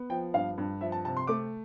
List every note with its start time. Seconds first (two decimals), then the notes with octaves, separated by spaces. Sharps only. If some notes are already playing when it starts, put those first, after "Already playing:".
Already playing: B3
0.10 F3 G5
0.34 G2 F5
0.58 G2
0.81 F3 E5
0.92 A5
1.04 C3 A5
1.17 C6
1.27 A3 D6